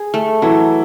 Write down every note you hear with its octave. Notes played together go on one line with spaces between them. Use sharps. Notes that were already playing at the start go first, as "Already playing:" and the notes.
Already playing: G#4
A3
E3 F#3 E4